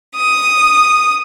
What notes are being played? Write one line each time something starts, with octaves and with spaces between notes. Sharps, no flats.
D#6